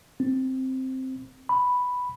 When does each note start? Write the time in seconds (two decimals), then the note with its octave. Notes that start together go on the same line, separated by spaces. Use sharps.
0.20 C4
1.49 B5